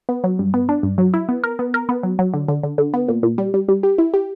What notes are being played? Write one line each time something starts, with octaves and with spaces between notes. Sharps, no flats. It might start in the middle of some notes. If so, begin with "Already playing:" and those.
B3
F#3
G2
B3
D4
G2
F#3
E4
B3
A#4
B3
A#4
B3
F#3
F#3
D3
D3
D3
D3
B3
A#2
A#2
G3
G3
G3
G4
E4
G4